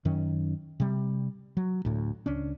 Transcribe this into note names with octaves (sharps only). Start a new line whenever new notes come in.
F#2 D#3 C#4
C3 G3
F#3
D2 A2
C#2 C#4 D4